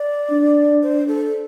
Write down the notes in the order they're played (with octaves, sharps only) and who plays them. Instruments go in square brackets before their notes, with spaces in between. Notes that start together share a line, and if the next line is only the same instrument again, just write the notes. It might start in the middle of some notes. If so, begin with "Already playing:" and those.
Already playing: [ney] D5
[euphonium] D4
[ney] C5
A4